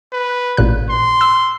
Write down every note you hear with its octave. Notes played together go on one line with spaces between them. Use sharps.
B4
A1 A#2 F#6
C6
E6